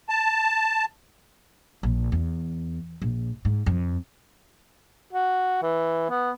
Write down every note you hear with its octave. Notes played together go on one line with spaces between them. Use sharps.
A5
A#1
E2
A#1
G#2
F2
F#4
E3
B3